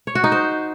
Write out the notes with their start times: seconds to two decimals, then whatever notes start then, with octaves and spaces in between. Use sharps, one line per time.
0.07 C#5
0.15 F#4
0.24 D#4
0.32 C5